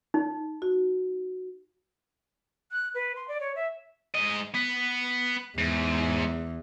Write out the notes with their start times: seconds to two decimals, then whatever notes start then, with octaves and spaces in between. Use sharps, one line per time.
0.14 D#4
0.62 F#4
2.72 F#6
2.95 B4
3.16 C6
3.28 D5
3.41 C#5
3.56 E5
4.14 G#2 D#5
4.54 B3
5.58 E2 G#2